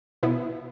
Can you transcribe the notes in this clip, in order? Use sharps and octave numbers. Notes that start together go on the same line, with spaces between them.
B2 B3 E4